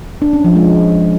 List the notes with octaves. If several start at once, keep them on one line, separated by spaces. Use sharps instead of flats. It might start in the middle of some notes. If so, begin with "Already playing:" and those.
D4
C#4
F3
G#3